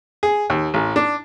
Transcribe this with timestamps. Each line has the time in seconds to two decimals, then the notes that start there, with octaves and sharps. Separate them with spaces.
0.23 G#4
0.50 D#2
0.74 A1
0.96 D4